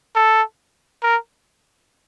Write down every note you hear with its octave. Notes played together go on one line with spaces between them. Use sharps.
A4
A#4